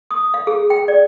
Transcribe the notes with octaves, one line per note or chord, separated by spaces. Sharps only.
D#6
F5
G#4
G5
D5